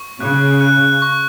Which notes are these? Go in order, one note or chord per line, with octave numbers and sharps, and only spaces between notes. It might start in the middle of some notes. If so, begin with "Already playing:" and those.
Already playing: C#6
C#3 F#6
F#6
C#6